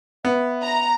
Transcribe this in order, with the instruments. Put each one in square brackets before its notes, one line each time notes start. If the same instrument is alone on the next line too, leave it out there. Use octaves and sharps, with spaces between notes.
[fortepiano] B3 [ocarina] E5
[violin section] A#5